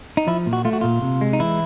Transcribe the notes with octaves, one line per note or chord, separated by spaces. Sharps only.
D#4
F3 E4
A#2
F#4
A3 F4
F#4
A#2 F4
C3
G#3
D#4
E3 E4